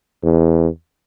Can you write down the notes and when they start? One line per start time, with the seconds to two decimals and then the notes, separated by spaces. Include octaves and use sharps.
0.23 E2